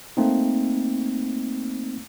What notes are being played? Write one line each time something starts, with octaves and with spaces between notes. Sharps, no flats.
A3 A#3 C4 D#4